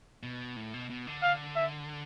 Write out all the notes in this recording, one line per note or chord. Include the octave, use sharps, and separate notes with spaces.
B2
A2
B2
B2
D3
F5
E5